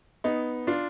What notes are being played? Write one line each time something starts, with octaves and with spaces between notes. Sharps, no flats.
B3 D#4
D4 F4